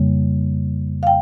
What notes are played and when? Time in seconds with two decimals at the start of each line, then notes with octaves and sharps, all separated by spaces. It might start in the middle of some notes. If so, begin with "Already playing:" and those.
Already playing: F2 C#3 G3 A#3
1.03 F5
1.07 G5